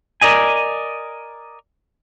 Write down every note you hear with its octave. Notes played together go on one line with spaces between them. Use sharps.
A#4 D5 D#5 G#5